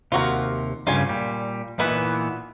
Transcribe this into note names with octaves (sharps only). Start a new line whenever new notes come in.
D#2 C3 F4 F#4 A#4
G2 C#3 G3 F4 G#5
A#2 G3
A#2 E3 B3 D#4 E4 B4